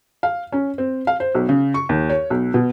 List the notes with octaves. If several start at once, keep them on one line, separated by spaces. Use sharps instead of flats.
F5
C#4
C4
F5
C5
B1
C#3
C#6
D#2
C#5
B1
B2